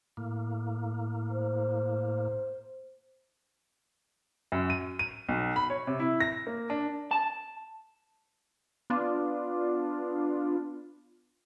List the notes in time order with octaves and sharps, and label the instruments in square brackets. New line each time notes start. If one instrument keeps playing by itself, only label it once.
[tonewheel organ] A2 A#3
[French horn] C5
[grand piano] F#2
D#7
D#7
B1
B5
C#5
C3
E4
A#6
A#3
D4
[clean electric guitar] A5
[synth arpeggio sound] B3 D4 F4